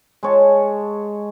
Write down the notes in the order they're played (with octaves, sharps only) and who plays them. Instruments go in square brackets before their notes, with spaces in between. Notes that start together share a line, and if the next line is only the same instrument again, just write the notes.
[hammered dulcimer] G#3 C#5 A5